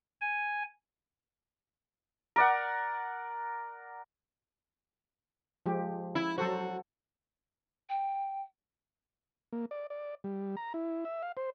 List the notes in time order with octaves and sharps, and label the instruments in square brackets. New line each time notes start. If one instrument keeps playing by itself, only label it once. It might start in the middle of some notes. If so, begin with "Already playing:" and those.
[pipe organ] G#5
[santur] A#4 D5 F#5
[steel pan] F3 G#3 G4
[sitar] E4
[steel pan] F#3 A4 C5 [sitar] F#4
[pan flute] G5
[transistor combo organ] A#3
D5
D5
G3
A#5
E4
E5
F5
C5